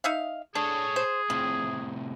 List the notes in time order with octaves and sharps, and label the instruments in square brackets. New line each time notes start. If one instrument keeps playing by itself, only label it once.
[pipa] D#4 E5 F5
[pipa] D4 [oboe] G#4 [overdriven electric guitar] A4 C#5
[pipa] C5
[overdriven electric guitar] A2 C3 [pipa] F3